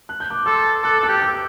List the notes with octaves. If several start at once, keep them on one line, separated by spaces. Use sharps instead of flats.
F#6
G6
D6 F#6
A4 C6 E6
A4 D6 F#6
A4 D6 F#6
G4
E6 G6